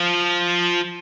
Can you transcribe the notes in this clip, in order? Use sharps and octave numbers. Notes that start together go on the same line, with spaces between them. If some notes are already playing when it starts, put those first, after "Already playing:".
Already playing: F3